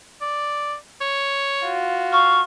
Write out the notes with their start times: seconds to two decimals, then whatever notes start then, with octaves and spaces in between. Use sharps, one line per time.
0.21 D5
1.01 C#5
1.62 F4 F#4
2.13 F5 C#6